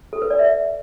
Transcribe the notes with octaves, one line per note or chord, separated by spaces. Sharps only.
A4
B4
D5
E5